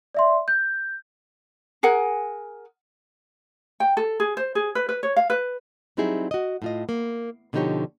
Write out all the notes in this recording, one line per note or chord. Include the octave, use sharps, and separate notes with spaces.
D5 E5 C6
G6
G#4 A#4 F#5 G#5
G5
A4
G#4
C5
G#4
B4
B4
C#5
F5
B4
F#3 G3 C4 D#4 E4 G#4
F#4 D#5
A2 F4 D#5
A#3
B2 D3 F3 D#4 G4 C#5